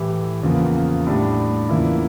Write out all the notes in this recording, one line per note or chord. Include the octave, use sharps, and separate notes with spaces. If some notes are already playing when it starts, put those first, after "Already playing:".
Already playing: A2 E3 A3 E4 G4
E2 C#3 F3 A#3
A2 G3 D4
E2 C#3 F3 A#3 E4